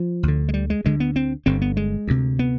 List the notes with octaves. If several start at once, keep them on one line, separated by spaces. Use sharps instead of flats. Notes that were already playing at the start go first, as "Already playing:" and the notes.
Already playing: F3
D2 D3
G#3
G3
G#3
D2 D3 G#3
B3
C4
G1 G2 D3 C4
B3
G#3
D2 C3
B3